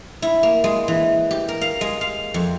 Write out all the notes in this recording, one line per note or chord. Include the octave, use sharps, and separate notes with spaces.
E4
A#3
G#3
E3
G4
A#4
F5
G#3
F5
F2